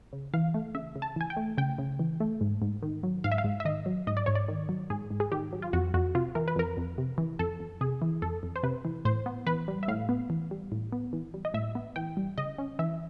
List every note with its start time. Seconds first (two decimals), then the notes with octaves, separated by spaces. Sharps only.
0.13 C#3
0.34 E3 F5
0.54 A3
0.75 C#3 E5
0.96 C#3
1.02 A5
1.16 E3 G#5
1.30 G5
1.37 A3
1.58 C#3 G5
1.78 C#3
1.99 E3
2.20 A3
2.41 G#2
2.62 G#2
2.82 D#3
3.03 F#3
3.24 G#2 F5
3.32 E5
3.38 F5
3.44 G#2
3.60 E5
3.65 D#3 D#5
3.86 F#3
4.07 G#2 D#5
4.17 D5
4.26 G#2 C#5
4.35 D5
4.48 D#3
4.69 F#3
4.90 G#2 G#4
5.10 G#2
5.20 G#4
5.32 D#3 G4
5.53 F#3
5.62 F4
5.73 F2 F#4
5.94 F2 F#4
6.15 C3 F4
6.35 E3 A#4
6.48 B4
6.56 F2 A#4
6.77 F2
6.98 C3
7.18 E3
7.39 F2 A4
7.60 F2
7.81 C3 G#4
8.02 E3
8.22 F2 A4
8.43 F2
8.56 C5
8.63 C3 B4
8.85 E3
9.05 A2 C5
9.26 B3
9.47 E3 B4
9.68 G3
9.83 E5
9.88 A2 F5
10.09 B3
10.30 E3
10.51 G3
10.72 A2
10.93 B3
11.13 E3
11.34 G3
11.45 D#5
11.54 A2 E5
11.75 B3
11.96 E3 G5
12.17 G3
12.38 C#3 D#5
12.58 C#4
12.79 E3 E5